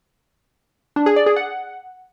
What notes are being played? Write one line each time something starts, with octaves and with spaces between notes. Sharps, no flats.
D4
G#4
D5
G#4
F#5